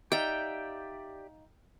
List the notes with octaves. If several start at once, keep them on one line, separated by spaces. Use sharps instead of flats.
D#4 G4 D5 E5 F5 G5